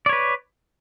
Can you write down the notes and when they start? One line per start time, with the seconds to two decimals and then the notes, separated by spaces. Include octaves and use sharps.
0.06 D5
0.09 C#5
0.13 B4